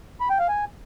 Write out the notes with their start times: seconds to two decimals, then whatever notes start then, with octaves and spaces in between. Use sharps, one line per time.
0.21 B5
0.30 G5
0.39 F5
0.49 G#5